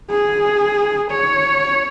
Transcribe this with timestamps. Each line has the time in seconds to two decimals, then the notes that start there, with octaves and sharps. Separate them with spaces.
0.10 G#4
1.12 C#5